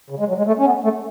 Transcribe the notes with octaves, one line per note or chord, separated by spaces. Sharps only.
C#3
G#3
F#3
G#3
A3
C#4
B3
A3